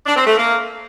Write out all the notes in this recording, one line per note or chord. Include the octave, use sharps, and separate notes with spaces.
D4
C4
A3
A#3